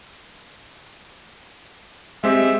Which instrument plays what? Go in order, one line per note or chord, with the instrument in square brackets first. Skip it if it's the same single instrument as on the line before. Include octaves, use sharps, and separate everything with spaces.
[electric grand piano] G#3 C4 G4 [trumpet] E5